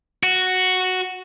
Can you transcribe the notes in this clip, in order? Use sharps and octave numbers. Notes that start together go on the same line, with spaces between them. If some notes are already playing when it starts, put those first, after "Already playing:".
F#4